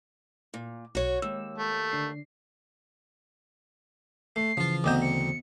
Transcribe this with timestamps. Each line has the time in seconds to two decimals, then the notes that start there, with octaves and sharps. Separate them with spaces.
0.54 A#2
0.95 B1 F#4 C#5
1.22 D#2 G#3 E6
1.58 A3
1.92 D3 D4 C7
4.36 A3 C7
4.57 C#3 E3 F3 F4
4.84 D2 B3 C4 D#5 A#5 D6 D#6
5.01 C#7